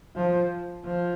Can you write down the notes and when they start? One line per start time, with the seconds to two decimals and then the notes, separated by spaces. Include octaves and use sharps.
0.16 F3
0.85 F3